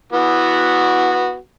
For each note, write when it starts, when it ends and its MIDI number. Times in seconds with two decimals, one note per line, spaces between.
0.12 1.36 52
0.12 1.36 59
0.12 1.36 66